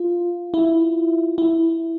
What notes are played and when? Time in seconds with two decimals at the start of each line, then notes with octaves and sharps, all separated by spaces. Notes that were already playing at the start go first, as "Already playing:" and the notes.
Already playing: F4
0.54 E4
1.38 E4